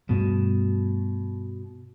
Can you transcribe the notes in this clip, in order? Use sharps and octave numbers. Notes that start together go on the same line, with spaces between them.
G2 B2 A3